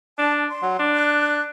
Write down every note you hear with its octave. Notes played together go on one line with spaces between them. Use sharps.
D4 A5
C6
F#3
D4
F#6